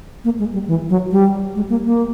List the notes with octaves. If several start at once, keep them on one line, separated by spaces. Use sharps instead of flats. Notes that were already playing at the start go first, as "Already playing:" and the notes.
A#3
G#3
G3
E3
F#3
G3
G#3
A#3
A#3